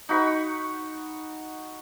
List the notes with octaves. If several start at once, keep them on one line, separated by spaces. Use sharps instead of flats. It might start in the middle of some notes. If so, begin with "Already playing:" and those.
D#4 F#4 B5 C#6